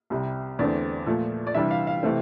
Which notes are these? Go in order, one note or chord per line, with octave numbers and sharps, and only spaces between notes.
C2 C3 G3
E2 D3 A3 C4 D5
A#2 F3 A3
D5
C3 E3 G3 D4 E5
F5
F5
C3 E3 A3 C4